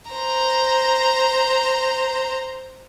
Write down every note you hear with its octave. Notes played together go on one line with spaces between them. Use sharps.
C5 A#5